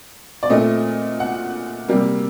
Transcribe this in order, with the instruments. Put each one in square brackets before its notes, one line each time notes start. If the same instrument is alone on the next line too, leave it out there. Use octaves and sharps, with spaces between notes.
[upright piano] D5
A#2 A3 C4 D#5
F#5
C3 G3 A#3